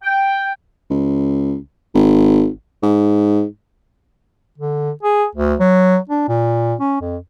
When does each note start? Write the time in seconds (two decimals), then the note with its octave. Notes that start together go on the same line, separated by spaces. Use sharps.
0.03 G5
0.90 C#2
1.94 G#1
2.83 G#2
4.58 D3
5.03 G#4
5.35 D2
5.60 F#3
6.09 D4
6.28 A#2
6.80 C#4
7.01 F2